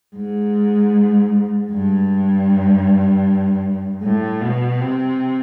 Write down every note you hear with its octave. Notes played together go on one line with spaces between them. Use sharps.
G#2
G2
A2
B2
C3